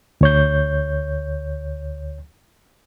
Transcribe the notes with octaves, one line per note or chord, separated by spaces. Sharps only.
D2 C#5 G6